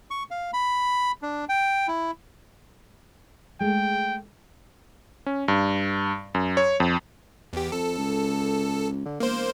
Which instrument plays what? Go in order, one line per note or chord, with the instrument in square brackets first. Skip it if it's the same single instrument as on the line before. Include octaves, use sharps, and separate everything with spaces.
[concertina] C#6
F5
B5
D4
G5
E4
[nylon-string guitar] G#3 A3 [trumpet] G5
[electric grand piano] C#4
G2
F#2
C#5
F2
[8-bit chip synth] E2 G4
[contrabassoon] F2 [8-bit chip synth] A4
[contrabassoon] C#2
D3
[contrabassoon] E1 [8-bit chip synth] A#3 C5